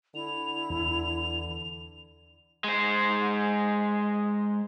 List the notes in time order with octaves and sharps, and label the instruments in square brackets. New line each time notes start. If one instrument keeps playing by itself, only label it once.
[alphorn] D3 [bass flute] E4 [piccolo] F7
[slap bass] E2 E3
[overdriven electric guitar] G#3 C5